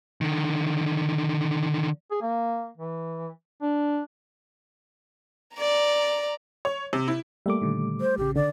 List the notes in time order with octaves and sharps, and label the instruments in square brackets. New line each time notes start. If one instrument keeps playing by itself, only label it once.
[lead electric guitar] D3 D#3
[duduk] G#4
A#3
E3
D4
[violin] D5 A#5
[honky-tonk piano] C#5
C3
E4
[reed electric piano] G3 A3 D6 [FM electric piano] A#3 E5
[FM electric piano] A#2 D3 D#3
[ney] C5
[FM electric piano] A1 C#3 [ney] G4
[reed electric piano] D3 [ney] D5